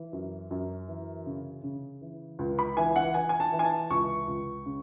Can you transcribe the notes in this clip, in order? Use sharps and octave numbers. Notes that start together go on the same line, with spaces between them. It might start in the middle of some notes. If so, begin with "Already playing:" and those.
Already playing: E3
F#2
F#2
E3
C#3
C#3
E3
C#2
B5
E3 G#5
F#5
E3 G#5
G#5
A5
E3
G#5
A5
C#2 C#6
C#2
C#3